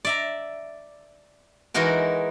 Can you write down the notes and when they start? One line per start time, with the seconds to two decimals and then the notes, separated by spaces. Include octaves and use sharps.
0.05 D5 E5 A#5
1.74 E3 G#3 D#4 F#4 A#4